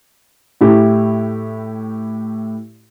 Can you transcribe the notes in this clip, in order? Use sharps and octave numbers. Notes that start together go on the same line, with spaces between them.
A2 E4 G4